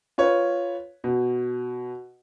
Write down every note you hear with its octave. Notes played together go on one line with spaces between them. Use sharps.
F4 B4 C#5
B2